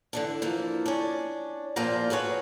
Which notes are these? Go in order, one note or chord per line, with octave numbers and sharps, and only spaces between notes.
D3 E3 D4
E3 F3 A#3
C#4 D4
E2 A#2 F3 A#3 F4 A#5
F#4 G#4 B4 C#5